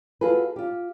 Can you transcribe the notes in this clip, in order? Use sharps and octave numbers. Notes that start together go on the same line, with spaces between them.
F4 F#4 G#4 A4 B4
F4 G4